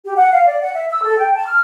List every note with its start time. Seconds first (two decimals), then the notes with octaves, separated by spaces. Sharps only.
0.05 G4
0.16 F#5
0.32 F5
0.46 D5
0.62 F#5
0.74 E5
0.90 E6
1.03 A4
1.18 G5
1.34 A5
1.46 F6